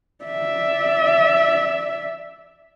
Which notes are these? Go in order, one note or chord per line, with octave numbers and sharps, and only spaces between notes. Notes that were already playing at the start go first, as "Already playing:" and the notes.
D5 E5